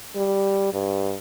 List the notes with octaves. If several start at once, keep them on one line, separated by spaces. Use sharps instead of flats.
G3
G2